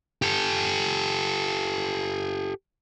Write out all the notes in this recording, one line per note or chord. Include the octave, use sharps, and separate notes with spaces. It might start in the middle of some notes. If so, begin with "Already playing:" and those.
G4 A4